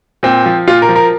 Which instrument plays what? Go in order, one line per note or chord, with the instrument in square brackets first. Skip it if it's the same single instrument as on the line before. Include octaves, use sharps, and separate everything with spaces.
[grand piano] A#2 C4
F3
A#2 F4
A#4
F3
A#4